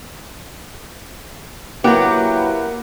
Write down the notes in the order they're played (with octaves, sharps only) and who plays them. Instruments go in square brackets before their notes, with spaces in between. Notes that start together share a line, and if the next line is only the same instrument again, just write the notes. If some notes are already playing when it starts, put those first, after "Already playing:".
[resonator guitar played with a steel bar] F#3 G4 [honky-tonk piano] A#3 B4 F#5 [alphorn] E4